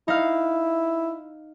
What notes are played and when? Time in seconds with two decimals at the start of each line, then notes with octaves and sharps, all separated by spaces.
0.08 D#4 E4 F5